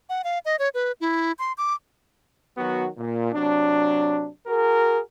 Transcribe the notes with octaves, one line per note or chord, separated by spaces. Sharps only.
F#5
F5
D#5
C#5
B4
E4
C6
D6
D#3 F#3 B3 F#4
A#2
C3 F#3 D4
F#4 G#4 A#4